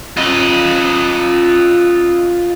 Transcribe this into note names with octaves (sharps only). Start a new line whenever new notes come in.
F4 D#5